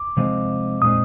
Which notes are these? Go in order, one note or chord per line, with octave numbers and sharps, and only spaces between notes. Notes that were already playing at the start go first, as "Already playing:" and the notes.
Already playing: D6
C3 F3 G#3 C4 D#4
A#2 G#3 C4 D#4 D#6